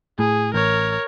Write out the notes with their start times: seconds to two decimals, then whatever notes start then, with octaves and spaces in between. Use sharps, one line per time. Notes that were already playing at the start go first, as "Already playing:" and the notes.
0.19 A2 G#4
0.54 A1 A#4 C#5